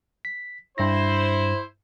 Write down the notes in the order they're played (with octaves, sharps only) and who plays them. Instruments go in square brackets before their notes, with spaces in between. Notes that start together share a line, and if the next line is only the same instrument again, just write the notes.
[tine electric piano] B6
[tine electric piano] G2 A#6 [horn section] E4 C5